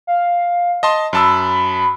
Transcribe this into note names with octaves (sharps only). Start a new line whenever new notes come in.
F5
D#5 A5 C6
F#2 A5 B5 E6